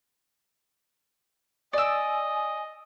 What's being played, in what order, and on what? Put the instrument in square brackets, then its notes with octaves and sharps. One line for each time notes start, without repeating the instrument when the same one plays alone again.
[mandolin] D5 E6 [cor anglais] D#5 [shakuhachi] G#5